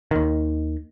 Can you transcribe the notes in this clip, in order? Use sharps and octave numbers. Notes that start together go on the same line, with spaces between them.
D#2 D#3